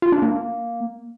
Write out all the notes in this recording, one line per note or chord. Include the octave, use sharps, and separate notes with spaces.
F4
D4
A#3